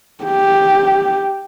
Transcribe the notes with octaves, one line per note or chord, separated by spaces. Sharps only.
G4